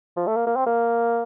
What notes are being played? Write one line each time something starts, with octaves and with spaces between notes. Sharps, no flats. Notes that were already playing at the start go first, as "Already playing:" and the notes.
F3
A3
A#3
A#3
C4
A#3